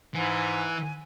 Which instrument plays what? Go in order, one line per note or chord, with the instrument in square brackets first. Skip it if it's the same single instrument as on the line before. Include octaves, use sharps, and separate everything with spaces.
[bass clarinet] G#2 [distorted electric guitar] E3 [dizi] G#5